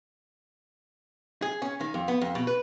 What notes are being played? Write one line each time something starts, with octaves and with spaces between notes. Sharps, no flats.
G#4
C#4
D#3
F2
B3
F2
B2
B4